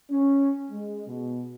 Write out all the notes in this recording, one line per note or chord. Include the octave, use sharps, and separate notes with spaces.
C#4
G#3
B2